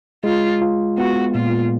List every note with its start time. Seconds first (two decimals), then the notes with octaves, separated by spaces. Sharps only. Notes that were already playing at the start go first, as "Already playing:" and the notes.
0.24 G#3 F4
0.62 F4
0.98 B3 F#4
1.35 A#2 F4